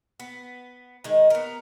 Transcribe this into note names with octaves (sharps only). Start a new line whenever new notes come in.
B3
D#3 G#3
B3 A#4